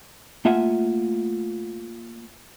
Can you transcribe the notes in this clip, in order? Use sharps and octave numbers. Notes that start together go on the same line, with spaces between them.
A3 A#3 F4 E5 F#5 G#5